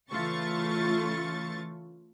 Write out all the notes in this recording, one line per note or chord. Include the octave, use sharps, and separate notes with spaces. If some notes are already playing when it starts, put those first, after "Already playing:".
C#3 E3 A3 F4 C#6 A6